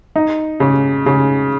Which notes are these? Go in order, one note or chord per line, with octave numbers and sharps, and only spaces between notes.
D#4
C#3
C#3